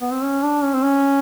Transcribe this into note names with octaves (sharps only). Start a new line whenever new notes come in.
B3
C4
C#4
D4
C#4
C4
C#4